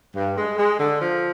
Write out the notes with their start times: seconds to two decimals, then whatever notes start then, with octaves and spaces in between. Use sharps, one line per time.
0.15 G2
0.37 G#3
0.57 G#3
0.78 D3
1.00 F3